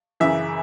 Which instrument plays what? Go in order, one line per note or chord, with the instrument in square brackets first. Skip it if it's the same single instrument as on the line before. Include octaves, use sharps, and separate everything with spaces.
[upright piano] F#2 C#3 E3 E5